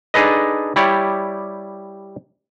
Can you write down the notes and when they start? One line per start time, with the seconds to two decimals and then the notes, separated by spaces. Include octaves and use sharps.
0.14 D4 D#4 G#4 A4 B4 D#5
0.76 G3 E4 G4 C#5 D5